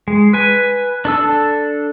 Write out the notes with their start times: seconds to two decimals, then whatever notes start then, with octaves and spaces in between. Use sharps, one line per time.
0.08 G#3
0.33 B4 G#5
1.05 D4 A4 E6